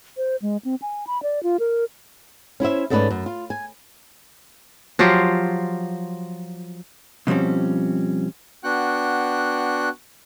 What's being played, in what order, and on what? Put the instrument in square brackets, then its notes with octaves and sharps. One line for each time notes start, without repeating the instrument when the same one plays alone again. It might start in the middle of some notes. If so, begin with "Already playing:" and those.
[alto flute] C5
G#3
C4
G#5
B5
D5
F4
A#4
[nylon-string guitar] C#4 E4 C5 E5
G#2 A3 C#4 G4 B4 D5
F#2
F4
G#5
[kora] F3 F#3 F4 G4
[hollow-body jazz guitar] B2 F3 G3 C4 C#4
[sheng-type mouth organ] B3 D4 F#4 F#5 G5 F#6